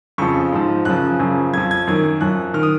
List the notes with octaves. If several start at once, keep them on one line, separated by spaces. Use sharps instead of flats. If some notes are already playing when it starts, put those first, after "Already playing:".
F2 C#3 F3 C#6
G#2 F3
F#2 C#3 F3 F#6
F#2 C#3 F3
F2 F3 G#6
G#6
F#2 D#3 G#6
F#2 F3 F#6
D#3 F6
D#6